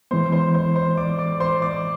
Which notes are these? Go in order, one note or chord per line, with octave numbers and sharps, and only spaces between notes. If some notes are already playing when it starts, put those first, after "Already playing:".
E3 G#3 B3 C5 C6
C5 C6
C5 C6
C5 C6
D5 D6
D5 D6
C5 C6
D5 D6